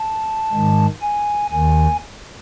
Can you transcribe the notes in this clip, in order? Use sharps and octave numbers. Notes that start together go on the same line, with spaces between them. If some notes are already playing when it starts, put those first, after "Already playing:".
Already playing: A5
G#2 D#3 G#3
G#5
D#2 D#3 G#5